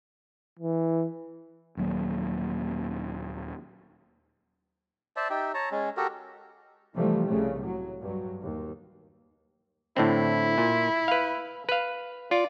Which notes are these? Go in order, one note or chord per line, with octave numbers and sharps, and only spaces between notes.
E3
D#1 D#2 F#3 A#3
C5 D5 E5 A5
D#4 G4 E5 G5
C#5 A5 A#5
G#3 C#4
F#4 G4 A4 A#4
C3 E3 F3 G3 A3
C2 C#3 A3
A2 F#3
G2 F#3
D#2
A2 D3 C4 E4
A#2
B4 F5
B4 F5
F4 D5